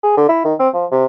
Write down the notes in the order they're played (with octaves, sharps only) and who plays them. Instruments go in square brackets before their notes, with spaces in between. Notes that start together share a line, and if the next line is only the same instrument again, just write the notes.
[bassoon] G#4
D3
E4
D#3
C4
F3
C3